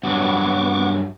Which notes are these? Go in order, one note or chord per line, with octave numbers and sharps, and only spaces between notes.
G2 F#3 B3 C#6 D6